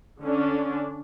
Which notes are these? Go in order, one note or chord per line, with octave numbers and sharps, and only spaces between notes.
D3 C#4 D4